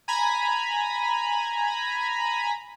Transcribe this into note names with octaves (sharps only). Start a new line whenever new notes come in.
G#5 A#5 B5